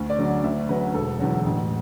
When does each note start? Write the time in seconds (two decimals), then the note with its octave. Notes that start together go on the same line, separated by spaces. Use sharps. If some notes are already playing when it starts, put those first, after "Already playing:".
Already playing: D2
0.10 D5
0.19 D3 F#3
0.44 D2 E5
0.69 D3 F#3 B4
0.94 E1 A4
1.20 E2 D3 F#3
1.45 A1